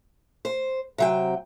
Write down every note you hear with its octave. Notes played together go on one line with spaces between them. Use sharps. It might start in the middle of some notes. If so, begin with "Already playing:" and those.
C5
C3 F#3 G5